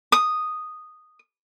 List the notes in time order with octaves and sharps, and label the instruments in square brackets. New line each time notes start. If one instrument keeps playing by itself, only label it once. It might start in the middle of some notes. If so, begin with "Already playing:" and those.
[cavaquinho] D#6